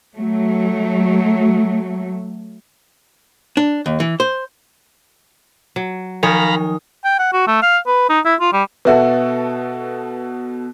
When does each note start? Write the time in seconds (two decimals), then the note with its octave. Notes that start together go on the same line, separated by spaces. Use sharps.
0.16 F#3 A3
3.57 D4
3.86 D#2
4.00 E3
4.20 C5
5.76 F#3
6.23 D#3 F3 C#5 F5 G#5 A#5 B5 D#6
7.04 G5
7.19 F#5
7.33 F#4
7.47 A3
7.63 F5
7.87 B4
8.09 D#4
8.25 E4
8.41 F4
8.53 G3
8.85 B2 F#4 A4 B4 E5